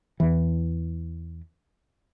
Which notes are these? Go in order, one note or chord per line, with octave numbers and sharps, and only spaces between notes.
E2 E3